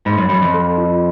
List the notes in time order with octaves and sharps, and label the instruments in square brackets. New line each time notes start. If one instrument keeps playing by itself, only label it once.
[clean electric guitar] G#2 [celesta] B5
[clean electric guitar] F#2
[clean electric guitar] F#2 [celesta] B5
[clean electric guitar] F2
[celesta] A4
F4